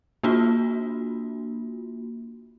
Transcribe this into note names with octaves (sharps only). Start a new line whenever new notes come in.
A#3 D4 F4 F#4